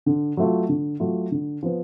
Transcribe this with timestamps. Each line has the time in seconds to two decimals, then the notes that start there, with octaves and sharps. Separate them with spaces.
0.06 D3
0.37 F#3 A3 F4
0.69 D3
1.00 F#3 A3 F4
1.31 D3
1.63 F3 B3